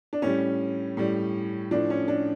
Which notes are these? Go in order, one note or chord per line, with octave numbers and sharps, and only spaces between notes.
D4
A2 G3 C#4
A2 G3
A2 F3 D4
C#4
D4